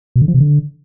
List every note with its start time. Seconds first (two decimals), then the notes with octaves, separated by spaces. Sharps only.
0.16 B2
0.22 D3
0.28 F3
0.34 C3
0.40 D3